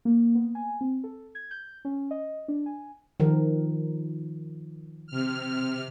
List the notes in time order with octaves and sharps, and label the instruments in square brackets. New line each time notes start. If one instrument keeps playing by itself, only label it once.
[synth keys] A#3
B3
G#5
C4
A4
G#6
G6
C#4
D#5
D4
G#5
[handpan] D#3 F3 A#4
[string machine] C3 F6